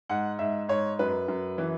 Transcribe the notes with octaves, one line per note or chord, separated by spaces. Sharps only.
G#2 F#5
G#2 E5
G#2 C#5
F#2 B4
F#2
E3